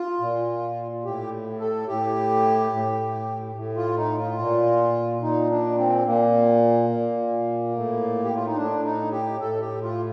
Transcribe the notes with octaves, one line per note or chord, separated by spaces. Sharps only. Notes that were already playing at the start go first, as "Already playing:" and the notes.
Already playing: F4
A#2
A2 G4
A4
A2 G4
A2
A2
F4
D#4
F4
A#2
A#2 D#4
D4
C4
A#2 A#3
A#2
A2
G4
F4
D#4
A2 D4
D#4
G4
A2 A4
G4
F4